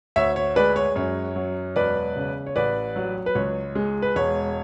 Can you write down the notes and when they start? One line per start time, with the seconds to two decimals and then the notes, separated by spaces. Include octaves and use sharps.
0.16 D2 C#5 E5
0.36 C#5
0.56 G#3 B4 D5
0.76 C#5
0.96 F#2 C#5
1.36 F#3
1.76 E1 B4 D5
2.16 C#3
2.46 C#5
2.56 A1 B4 D5
2.96 F#3
3.26 B4
3.35 C#2 C#5
3.75 G#3
4.02 B4
4.15 E1 C#5